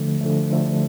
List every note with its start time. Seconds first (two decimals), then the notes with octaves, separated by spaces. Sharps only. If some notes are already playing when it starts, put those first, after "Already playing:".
Already playing: D3 F3 A3
0.21 D3 F3 A3
0.50 D3 F3 A3